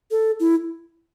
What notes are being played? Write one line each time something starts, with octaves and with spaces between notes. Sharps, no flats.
A4
E4